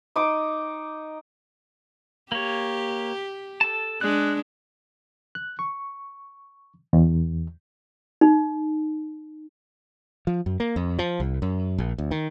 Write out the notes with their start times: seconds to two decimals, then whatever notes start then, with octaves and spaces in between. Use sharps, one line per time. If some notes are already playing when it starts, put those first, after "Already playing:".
0.16 D#4 D6 D#6
2.32 A#3 G4 C#5
3.61 A4 A5
4.01 G#3 D4 D5 F#6
5.35 F#6
5.59 C#6
6.93 E2
8.21 D#4
10.27 F3
10.46 F#2
10.60 A#3
10.76 F2
10.99 F3
11.20 C2
11.42 F#2
11.78 A#1
11.98 D2
12.11 D#3